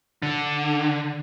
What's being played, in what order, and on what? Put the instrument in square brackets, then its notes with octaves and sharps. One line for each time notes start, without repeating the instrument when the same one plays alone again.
[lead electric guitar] D3